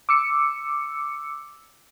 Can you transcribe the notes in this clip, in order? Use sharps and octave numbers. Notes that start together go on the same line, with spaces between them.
D6 E6 C#7